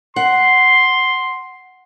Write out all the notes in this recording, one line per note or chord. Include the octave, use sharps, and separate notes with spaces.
F#5 C6